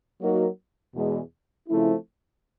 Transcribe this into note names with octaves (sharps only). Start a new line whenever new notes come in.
F#3 A#3 D#4 F#4 A#4
E2 B2 G#3
C#3 F3 A3 C4 E4